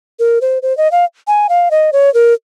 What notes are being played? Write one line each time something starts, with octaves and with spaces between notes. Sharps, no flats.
A#4
C5
C5
D#5
F5
G#5
F5
D#5
C#5
A#4